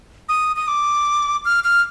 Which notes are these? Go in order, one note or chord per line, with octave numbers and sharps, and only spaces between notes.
D#6
D#6
D6
F6
F6